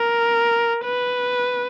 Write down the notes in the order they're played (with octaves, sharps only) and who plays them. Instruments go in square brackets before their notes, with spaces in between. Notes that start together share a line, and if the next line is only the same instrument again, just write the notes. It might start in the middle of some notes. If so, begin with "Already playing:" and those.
Already playing: [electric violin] A#4
B4